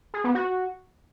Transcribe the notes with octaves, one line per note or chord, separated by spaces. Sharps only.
G#4
B3
F#4